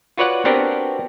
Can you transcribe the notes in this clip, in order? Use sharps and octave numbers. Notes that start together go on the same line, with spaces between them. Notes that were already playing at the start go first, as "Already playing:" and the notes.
F4 F#4 B4 C#5 D5 F#5
B3 C4 D4 F#4 G4 A#4